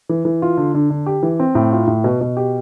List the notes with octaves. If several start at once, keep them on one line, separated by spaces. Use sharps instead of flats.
E3
E3
F4
D3
D3
D3
G4
E3
C4
A2
F4
A2
B2
B2
G4